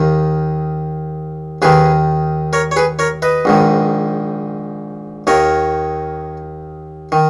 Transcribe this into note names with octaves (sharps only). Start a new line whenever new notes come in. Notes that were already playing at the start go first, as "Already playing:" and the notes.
Already playing: D#2 D#3
D#2 D#3 G#4 B4
A#4 C#5
C#5
G#4 B4
A#4 C#5
B4 D#5
A#1 G#2 D#3
D#2 D#3 A#4 C#5
D#3